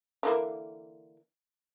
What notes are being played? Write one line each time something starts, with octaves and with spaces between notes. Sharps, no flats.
D3 E3 A#3